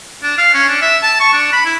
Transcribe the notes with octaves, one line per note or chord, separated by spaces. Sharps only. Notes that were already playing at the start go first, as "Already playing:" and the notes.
D4
F5
C#4
D4
E5
A5
C#6
D4
B5
E4